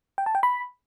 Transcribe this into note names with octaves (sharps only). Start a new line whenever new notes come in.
G5
A5
G5
B5